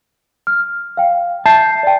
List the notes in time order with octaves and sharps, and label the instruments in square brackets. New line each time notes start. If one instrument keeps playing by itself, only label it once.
[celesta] F6
F5 G5
[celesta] E5 G6 C7 [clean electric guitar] A5
[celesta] D5 G5